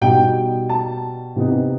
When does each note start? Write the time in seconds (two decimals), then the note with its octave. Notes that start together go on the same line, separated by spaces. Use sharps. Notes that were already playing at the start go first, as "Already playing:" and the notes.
0.01 B2 G3 D#4 G5
0.69 A5
1.36 C3 E3 B3 D#4